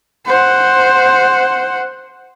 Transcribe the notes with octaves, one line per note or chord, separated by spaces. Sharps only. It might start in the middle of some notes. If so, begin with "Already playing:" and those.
C5 F#5